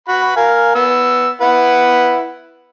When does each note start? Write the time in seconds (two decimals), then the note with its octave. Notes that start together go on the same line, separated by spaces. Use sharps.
0.08 F#4 B5
0.36 A#4 F5 G#5
0.75 B3 E6
1.41 E4 B4 F#5